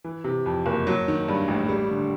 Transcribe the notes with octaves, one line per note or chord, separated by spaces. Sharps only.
E3
C3
F2
F#1
F#3
D#3
G2
A1
G3
D3